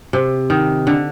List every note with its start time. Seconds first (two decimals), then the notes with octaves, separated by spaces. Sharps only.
0.13 C3
0.50 D#3
0.87 D3